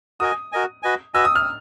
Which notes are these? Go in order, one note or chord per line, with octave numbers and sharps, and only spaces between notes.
F#4 A#4 D#5 G#5 D#6
F#4 A#4 D#5 G#5
F#4 B4 D#5 G#5
F#4 B4 D#5 G#5 E6
D#6
F6